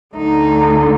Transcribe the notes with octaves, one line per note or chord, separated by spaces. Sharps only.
D2 D3 D#4